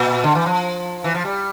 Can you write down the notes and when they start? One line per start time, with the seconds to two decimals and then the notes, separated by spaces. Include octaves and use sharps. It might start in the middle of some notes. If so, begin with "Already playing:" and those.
Already playing: A#2
0.24 D3
0.35 E3
0.46 F3
1.04 E3
1.15 F3
1.25 G3